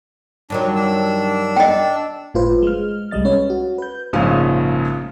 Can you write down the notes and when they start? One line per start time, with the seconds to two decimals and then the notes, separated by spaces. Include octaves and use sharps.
0.50 G2 D#3 F#3 D4
0.75 D4 E6
1.57 D#5 G5
2.34 G1 A2 F4 B4 C5
2.62 G#3 F6
3.11 C2 G3 G#3 D#5 A6
3.25 C#4 B4 C#5 F5
3.50 F#4
3.78 B4 G6
4.13 A#1 G#2 C#3 F3 C#4 F5